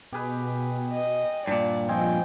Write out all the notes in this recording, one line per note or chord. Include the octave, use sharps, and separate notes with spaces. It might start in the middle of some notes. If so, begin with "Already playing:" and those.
B2 G4 G#4 B4
D#5
G2 A#2 D5
F3 C4 D#5 G5 G#5